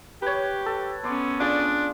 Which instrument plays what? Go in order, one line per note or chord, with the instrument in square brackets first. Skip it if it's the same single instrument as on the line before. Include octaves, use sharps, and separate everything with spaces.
[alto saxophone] G4 [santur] B4 C#5
[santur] A4
[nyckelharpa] B3 C#4 [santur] C6 D6
[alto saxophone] D4 [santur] F4 G#4 D5